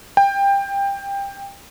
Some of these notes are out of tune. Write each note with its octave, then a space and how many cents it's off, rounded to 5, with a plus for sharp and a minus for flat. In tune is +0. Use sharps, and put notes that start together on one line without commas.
G5 +20